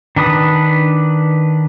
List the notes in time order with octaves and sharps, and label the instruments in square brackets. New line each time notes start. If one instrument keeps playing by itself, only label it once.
[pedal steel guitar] D#3 D4 B4 D#6